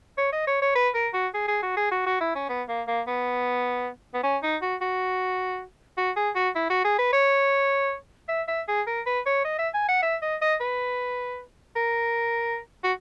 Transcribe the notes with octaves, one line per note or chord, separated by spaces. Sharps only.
C#5
D#5
C#5
C#5
B4
A#4
F#4
G#4
G#4
F#4
G#4
F#4
F#4
E4
C#4
B3
A#3
A#3
B3
B3
C#4
D#4
F#4
F#4
F#4
G#4
F#4
E4
F#4
G#4
B4
C#5
E5
E5
G#4
A#4
B4
C#5
D#5
E5
G#5
F#5
E5
D#5
D#5
B4
A#4
F#4